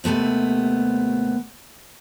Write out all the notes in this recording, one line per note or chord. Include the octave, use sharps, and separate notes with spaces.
D#2 C3 A3 B3 C4